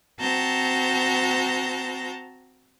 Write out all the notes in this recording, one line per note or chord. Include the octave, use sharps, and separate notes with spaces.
C4 F#4 A5 A#5 G6 A#6